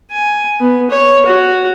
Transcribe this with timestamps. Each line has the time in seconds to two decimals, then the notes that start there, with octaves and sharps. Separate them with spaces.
0.11 G#5
0.60 B3
0.90 C#5
1.26 F#4